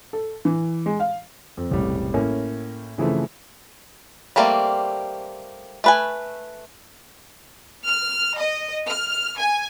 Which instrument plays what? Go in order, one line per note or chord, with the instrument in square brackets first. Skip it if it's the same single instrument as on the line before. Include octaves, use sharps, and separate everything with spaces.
[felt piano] A4
E3
G#3
F5
[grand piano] F2
E1 A1 C3 G3
A2 A#3 C#4
C#3 E3 F3 A3 C4
[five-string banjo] G3 A3 A#3 C4 D5
A3 B4 G#5
[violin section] F6
D#5
F6
G#5